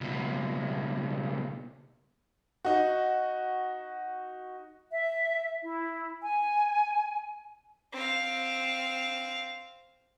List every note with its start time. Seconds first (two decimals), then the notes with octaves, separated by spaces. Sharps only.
0.01 C#2 B2
2.65 D#4 F#4
4.90 E5
5.63 E4
6.22 G#5
7.93 C4 F5